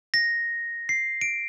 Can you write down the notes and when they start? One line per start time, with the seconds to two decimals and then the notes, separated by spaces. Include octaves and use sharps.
0.14 A#6
0.89 C7
1.21 D7